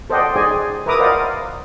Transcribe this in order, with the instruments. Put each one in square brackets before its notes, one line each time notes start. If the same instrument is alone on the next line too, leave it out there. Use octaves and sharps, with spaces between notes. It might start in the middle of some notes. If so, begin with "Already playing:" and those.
[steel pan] A4 C5 D5 D#5 F#5 G5
D#4 G#4 C5 D5 D#5 G#5
A#4 B4 E5 A#5 D6 D#6
A#4 C5 D5 D#5 F5 F#5